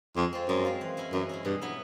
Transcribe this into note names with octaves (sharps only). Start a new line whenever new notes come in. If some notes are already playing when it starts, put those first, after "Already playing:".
F2 G#3
C4 F4
F#2 G#3
C4 F4
E3
G#3 C#4 E4
F#2 E3
G#3 C#4 E4
G2 B2
F#3 B3 E4